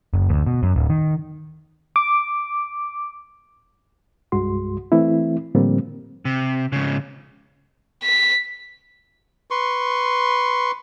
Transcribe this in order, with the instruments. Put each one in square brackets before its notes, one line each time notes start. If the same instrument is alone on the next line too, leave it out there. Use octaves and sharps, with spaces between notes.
[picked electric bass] F#1
D2
B2
F#2
D1
D#3
[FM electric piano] D6
[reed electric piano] C2 G2 G#3 F#4 C6
E3 A3 C4 E4
A2 D3 F3 G3 A#3 C4
[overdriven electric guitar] C3
G#2 C#3
[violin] B6
[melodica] B4 C6 C#6